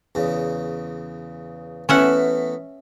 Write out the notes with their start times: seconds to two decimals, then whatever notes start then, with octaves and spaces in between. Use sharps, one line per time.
0.15 E2 C#3
1.89 E3 A3 B3 C#4 E5 F#5